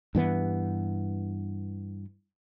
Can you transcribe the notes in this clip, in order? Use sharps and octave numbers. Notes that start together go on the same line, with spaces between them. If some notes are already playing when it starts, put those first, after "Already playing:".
G2 E3 B3